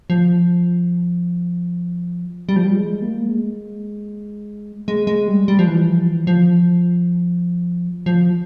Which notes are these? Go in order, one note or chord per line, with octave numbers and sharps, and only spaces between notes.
F3
G3
F3
G3
G#3
A#3
G#3
G#3
G#3
G3
G3
F3
E3
F3
E3
F3
F3